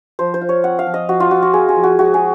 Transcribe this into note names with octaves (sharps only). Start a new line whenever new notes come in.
F3 C5
C5
F4
C#5
C4 F#5
F5
F3
D#5
F3 F#4
F4
F4 F#4
F#4
C4 G#4
G#4
F3
F#4
G#3 F#4
G#4